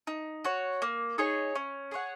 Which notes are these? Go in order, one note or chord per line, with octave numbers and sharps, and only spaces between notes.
D#4
F#4 C#5
A#3
D#4 G#4 C#5
C#4
G#4 C#5 F#5